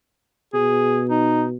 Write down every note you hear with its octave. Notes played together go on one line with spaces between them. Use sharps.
B2 G#4
D#4